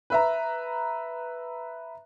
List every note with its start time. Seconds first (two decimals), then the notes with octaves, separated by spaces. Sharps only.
0.10 B4 E5 A#5